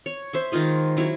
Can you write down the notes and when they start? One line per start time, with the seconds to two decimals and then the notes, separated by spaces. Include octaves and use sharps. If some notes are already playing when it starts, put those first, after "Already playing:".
0.06 C#5
0.33 C5 E5 C#6
0.52 D#3 G#3 F4 G#4
0.97 F#3 E4 C#5